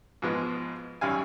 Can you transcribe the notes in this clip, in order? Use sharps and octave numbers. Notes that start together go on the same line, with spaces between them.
G#2 B2 F3 G#3 B3
G#1 F#2 G3 F5 G#5